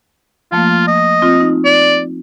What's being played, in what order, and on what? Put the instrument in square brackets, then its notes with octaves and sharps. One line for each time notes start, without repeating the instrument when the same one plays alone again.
[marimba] F3 A3 A#3 [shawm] F4
[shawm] D#5
[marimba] C4 F4
D#4
[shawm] D5